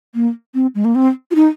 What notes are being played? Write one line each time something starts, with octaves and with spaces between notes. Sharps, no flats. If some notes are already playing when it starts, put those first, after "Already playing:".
A#3
C4
G#3
A#3
C4
F4
D#4